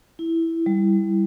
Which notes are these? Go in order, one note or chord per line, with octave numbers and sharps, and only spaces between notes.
E4
G3